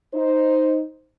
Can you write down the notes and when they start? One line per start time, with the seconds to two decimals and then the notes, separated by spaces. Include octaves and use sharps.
0.14 D#4 C5